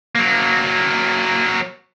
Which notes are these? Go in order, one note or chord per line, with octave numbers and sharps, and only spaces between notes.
F#3 A#3